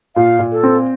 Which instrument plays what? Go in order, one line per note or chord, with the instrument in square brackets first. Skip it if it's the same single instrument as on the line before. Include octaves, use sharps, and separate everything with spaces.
[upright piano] A#2 [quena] F5
[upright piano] A#2
[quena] A4
[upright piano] C4